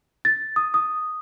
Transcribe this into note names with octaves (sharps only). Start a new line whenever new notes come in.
A6
D#6
D#6